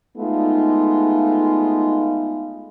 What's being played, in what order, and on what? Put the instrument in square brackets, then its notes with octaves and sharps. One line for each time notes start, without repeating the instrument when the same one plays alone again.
[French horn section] G#3 A3 B3 D#4 F4